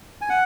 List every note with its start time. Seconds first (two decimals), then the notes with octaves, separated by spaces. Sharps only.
0.21 G#5
0.30 F#5